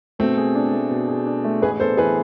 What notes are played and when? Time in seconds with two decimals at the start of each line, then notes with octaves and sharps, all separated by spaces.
0.19 B2 A3 C4
0.37 G#4
0.55 D4
0.73 A3
0.91 B2
1.08 G#4
1.26 D4
1.44 A3
1.62 A1 G#4 B4
1.80 B3 A4 C5
1.97 E3 G#4 B4